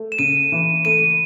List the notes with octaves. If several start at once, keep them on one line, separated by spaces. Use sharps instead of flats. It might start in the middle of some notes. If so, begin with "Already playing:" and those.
Already playing: A3
E7
C#3 D#7
E3
A3 D#7